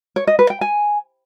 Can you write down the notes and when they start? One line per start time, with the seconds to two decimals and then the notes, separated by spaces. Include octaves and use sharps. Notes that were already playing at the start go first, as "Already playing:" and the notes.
0.16 C#5
0.27 D#5
0.39 B4
0.50 G5
0.61 G#5